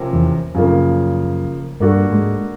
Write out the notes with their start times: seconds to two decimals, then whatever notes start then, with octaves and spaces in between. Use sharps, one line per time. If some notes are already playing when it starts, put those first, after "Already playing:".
Already playing: C3 F3 A#3 C#4
0.13 E2 E3
0.55 F#2 C#3 F3 F#3 A#3
1.80 G2 G3 A#3 D4 F#4 A4
2.12 G#2 G#3